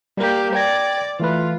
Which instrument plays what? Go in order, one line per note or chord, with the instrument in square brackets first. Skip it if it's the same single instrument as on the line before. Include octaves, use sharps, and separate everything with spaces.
[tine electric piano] G3 [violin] A#3 G4
[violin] D5 [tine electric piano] G5 G#6 A#6
[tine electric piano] E3 A3 B4 [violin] F4